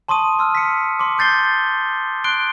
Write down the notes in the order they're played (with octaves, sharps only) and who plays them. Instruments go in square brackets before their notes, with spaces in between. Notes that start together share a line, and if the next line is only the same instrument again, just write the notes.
[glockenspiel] A5 C6 C#6 D#6 D#7
C6 E6 F6
B6 C#7
C6 D6
D6 G6 A6 C7 G7
C6 F#6 C7 D7 G7